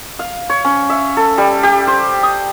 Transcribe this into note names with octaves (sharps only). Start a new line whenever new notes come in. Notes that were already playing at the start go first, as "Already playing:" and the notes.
F5
C#5
C#4
E5
A4
G3
G4
C5
D#6